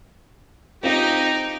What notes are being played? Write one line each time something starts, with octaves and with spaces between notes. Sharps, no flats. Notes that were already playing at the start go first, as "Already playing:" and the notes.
C4 D#4 F4 G4